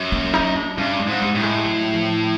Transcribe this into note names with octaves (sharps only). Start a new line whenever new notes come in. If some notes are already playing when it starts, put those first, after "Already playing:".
Already playing: F#2
A#3
D#4
D4
G2 C#4
G#3
G#2
G3
A2
G#3
F#3
F3